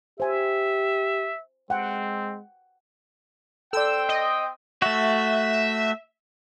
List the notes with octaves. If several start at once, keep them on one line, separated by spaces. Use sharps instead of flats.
G4 C5 E5 G#5
G#3 C4 F#5 G5
C4 A4 D5 G5 E6
D#5
A3 F#4 E5